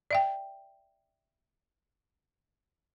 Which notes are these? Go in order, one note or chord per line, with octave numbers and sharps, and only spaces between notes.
D5 E5 G5